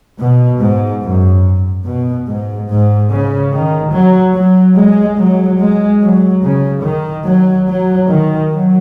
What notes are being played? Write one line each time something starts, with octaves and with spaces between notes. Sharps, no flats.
B2
G#2
F#2
B2
G#2
G#2
C#3
D#3
F#3
F#3
G#3
F#3
G#3
F#3
C#3
D#3
F#3
F#3
D#3
F#3